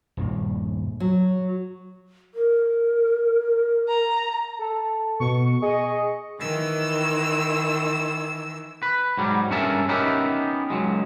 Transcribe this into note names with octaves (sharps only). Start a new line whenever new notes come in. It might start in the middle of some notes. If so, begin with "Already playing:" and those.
D#1 G2 A#3
F#3
A#4
A#5
A4
B2 C#6
G#4 D#5
D#3 E3 E6
B4
G#2 F#3 G3
G2 C#4 G#4 A#4 E5 A5
B3 C#4 D#4 G4 A#4 E5
C#2 G2 F#3 G#3